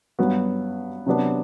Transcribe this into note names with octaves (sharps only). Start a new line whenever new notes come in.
G2 F#3 B3 F#4
C3 F#3 B3 D4